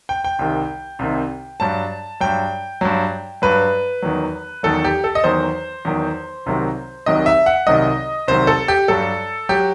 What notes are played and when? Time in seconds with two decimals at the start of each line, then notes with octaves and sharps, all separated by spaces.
0.09 G5
0.24 G5
0.39 C2 C3 D#3
0.99 C2 C3 D#3
1.60 G2 F#3 A5
2.20 G2 F#3 G5
2.81 G2 F#3
3.42 G2 F#3 B4
4.02 E2 D#3 F#3
4.63 E2 D#3 F#3 A4
4.84 G4
5.04 A4
5.15 D#5
5.24 E2 D#3 F#3 C5
5.85 E2 D#3 F#3
6.46 C2 C3 D#3 F#3
7.06 C2 C3 D#3 F#3 D#5
7.26 E5
7.46 F#5
7.67 C2 C3 D#3 F#3 D#5
8.28 C2 C3 D#3 F#3 C5
8.47 A4
8.68 G4
8.88 G2 F#3 A4
9.49 F#3 G4